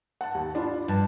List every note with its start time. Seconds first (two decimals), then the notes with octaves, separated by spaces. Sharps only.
0.21 F#5 A5
0.35 D#2
0.55 D4 F4 B5
0.88 G2 F3 A5